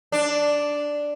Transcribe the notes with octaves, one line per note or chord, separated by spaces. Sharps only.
D4